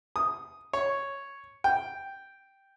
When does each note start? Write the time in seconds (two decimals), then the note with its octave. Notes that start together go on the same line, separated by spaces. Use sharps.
0.16 D#6
0.73 C#5
1.64 G5